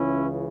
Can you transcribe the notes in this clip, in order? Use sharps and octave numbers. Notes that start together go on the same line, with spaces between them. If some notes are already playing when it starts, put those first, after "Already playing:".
Already playing: C#2 C#3 E3 C#4 E4